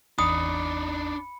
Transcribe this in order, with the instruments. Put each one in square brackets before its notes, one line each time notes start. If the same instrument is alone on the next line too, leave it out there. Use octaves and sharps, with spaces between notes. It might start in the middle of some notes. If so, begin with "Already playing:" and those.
[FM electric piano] G#1 E2 A#5 [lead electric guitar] D4 D#4 [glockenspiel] B5 C#7 [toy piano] D#6